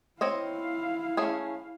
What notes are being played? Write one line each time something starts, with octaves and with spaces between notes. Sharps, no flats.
C4 E4 C#5 D#5 F5
A3 C#4 G#4